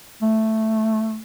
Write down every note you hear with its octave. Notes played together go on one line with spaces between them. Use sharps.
A3